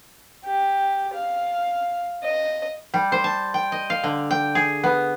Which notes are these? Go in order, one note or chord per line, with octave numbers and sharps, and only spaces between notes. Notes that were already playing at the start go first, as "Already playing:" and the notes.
G4
F5
D#5
G3
C5
A5
G5
D#5
F5
D3
G5
G#4
B3